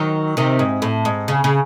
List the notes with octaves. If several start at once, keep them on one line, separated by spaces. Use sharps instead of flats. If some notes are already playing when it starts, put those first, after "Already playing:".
Already playing: D#3 F#3
C3 D#3
G#2
A2
G#2
C#3
C#3